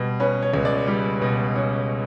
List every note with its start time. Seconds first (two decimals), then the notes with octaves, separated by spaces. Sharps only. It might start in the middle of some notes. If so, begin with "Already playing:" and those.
Already playing: B2 G3
0.20 C#4 B4
0.43 C#5
0.54 C#2
0.65 D5
0.87 G3
1.21 B2
1.55 C#4